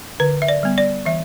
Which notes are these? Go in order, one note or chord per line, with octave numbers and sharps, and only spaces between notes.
D3 B4
E5
D5
G3 B3
D5
E3 E5